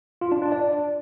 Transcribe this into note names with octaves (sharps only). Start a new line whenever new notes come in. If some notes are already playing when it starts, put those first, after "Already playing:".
F4
D4
D4
D5